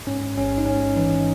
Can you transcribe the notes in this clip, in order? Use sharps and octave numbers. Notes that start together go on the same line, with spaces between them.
G#2 C#4
A1 C#4
D#4
G#2 C#4
E3 D#4